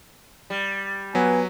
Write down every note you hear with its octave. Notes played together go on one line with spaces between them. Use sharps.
G3
F#3 B3 B4 G#5